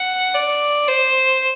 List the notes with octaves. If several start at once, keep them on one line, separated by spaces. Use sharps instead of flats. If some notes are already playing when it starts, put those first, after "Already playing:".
Already playing: F#5
D5
C5